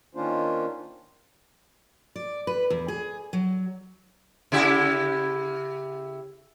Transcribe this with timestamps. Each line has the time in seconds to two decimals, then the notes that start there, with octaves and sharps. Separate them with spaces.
0.15 D#3 A#3 C#4 D4 F4 C5
2.16 D5
2.47 B4
2.70 E2
2.88 G#4
3.33 F#3
4.52 C#3 E4 G4